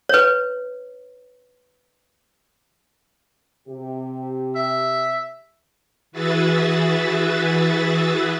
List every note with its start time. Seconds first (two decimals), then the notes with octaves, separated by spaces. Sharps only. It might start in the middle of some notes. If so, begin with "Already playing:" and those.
0.09 B4 C#5
3.68 C3 G4
4.55 E5
6.12 E3 F#4 G#4 B4 E5 A6